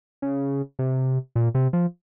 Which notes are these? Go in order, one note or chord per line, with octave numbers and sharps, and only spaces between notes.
C#3
C3
A#2
C3
F3